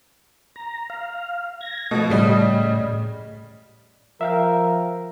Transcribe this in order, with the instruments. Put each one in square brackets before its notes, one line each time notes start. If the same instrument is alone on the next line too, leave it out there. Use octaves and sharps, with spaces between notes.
[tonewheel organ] A#5
F5
G#6 A#6
[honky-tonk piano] B2 F3 [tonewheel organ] A3 D#5
[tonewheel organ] A2 [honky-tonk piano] C#3 G3 D#5
[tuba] F3 [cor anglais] A#4 [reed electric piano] E5 F5 G5